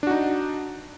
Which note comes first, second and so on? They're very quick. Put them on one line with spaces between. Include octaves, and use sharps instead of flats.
D4 F#4 D#4